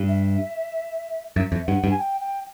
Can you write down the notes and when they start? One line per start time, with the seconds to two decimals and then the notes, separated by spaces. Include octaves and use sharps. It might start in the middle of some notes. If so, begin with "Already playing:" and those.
Already playing: G2
0.09 E5
1.36 F#2 E5
1.52 F2
1.67 G2 F#5
1.84 G2
1.91 G#5
1.99 G5
2.21 G5